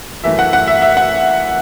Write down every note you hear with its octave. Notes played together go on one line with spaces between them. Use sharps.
F#2 E3 A3 E5
F#5
F#5
E5
E5
F#5